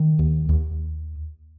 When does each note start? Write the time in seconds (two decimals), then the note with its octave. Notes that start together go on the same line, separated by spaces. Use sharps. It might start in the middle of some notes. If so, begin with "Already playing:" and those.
Already playing: D#3
0.19 D#2
0.49 D#2